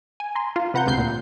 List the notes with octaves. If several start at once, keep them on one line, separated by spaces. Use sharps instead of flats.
G#5
A#5 C6
F4
C3 B4 F#5 A#5 G6
D2 C3 G6 C7
A#2